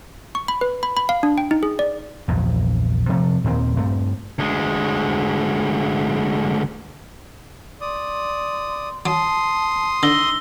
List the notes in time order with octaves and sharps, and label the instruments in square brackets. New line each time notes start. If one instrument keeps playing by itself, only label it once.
[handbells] C#6
B5
B4
B5
B5
F5
D4
G5
D#4
G#4
D5
[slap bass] A#1 E2 G2
C3 F3 F#3 A3
D#2 A#2 D#3 C4
G2 A3 C4
[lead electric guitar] D2 G#3
[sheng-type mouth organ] D5 D#6 [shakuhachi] C6
[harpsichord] F#3 [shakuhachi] A5 [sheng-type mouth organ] C6 D#6
[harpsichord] D3 [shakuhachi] D#4 [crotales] E6 A#6 G7